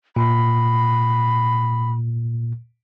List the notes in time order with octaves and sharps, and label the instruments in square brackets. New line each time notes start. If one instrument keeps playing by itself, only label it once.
[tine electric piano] A#2 [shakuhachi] B5